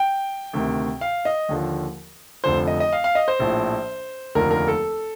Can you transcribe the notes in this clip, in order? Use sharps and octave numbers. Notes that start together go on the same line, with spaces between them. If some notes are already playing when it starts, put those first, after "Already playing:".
Already playing: G5
D2 C3 D#3
F5
D#5
D#2 D3 F3
F1 F2 D3 F3 C5
D#5
D#5
F5
F5
D#5
C5
A#1 A2 F3
F1 D#2 D3 F3 A#4
A#4
A4